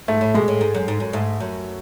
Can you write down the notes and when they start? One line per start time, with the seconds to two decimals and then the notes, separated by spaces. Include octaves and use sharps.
0.08 G#2 A3
0.21 A2
0.34 B2 G#3
0.48 A2
0.61 G#2
0.74 F#2
0.88 G#2
1.00 F#2
1.13 G#2 A3
1.40 F#2